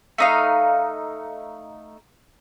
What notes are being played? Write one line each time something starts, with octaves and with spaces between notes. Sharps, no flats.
A3 D#4 F5